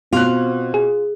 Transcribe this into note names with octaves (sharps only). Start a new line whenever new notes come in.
B2 C4 F4 F#6
G#4